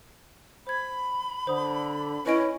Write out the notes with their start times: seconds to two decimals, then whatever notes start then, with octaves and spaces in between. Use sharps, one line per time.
0.67 C5 B5 G#6
1.47 D3 C5 D#6
2.26 C#4 E4 B4 D#5 D7